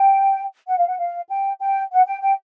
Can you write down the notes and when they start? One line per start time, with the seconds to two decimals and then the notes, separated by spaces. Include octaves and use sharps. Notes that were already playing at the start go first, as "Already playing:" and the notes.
Already playing: G5
0.68 F#5
0.78 F5
0.87 F#5
0.99 F5
1.30 G5
1.60 G5
1.92 F#5
2.07 G5
2.22 G5